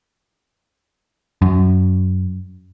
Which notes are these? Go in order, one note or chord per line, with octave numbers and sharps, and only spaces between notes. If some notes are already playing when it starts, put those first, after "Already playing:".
F#2